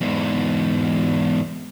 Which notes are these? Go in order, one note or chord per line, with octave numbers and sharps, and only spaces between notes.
E2 G#2